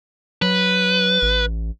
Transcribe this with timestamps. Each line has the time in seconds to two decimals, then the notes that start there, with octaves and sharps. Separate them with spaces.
0.42 F#3 B4
1.22 A1